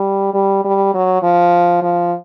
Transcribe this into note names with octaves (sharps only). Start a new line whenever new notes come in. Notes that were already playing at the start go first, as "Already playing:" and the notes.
Already playing: G3
G3
G3
F#3
F3
F3